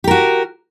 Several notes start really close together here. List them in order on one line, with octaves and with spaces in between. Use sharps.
G4 A#4 F#4